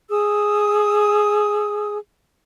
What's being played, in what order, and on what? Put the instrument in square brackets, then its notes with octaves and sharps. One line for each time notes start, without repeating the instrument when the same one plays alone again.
[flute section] G#4 D#6 E6